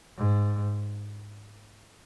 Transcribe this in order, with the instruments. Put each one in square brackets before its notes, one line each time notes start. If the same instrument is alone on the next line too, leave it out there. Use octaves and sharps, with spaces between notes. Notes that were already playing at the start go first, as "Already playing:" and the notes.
[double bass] G#2